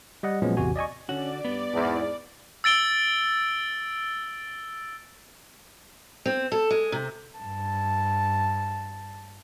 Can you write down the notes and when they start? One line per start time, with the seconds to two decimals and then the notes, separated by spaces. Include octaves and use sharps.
0.23 G3 D#5 F#5
0.42 A#2 F3 F#3 G#3 B3 C#4
0.57 A1 E2 C3 F#4 G#5
0.76 D5 D#5 G#5 C#6
1.09 D3 C#4 F#4 D5
1.45 G2 B3
1.74 E2 G#2
2.64 E6 A6 D7 G7
6.26 C4
6.52 A4
6.71 G#3
6.92 C3
7.39 G2 A5